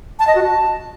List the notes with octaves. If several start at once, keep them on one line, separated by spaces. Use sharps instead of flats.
A5
D#5
F#4
A5